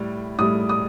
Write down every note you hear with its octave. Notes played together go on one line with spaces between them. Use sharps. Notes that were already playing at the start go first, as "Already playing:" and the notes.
Already playing: A2 G3
A2 G3 D#6
D#6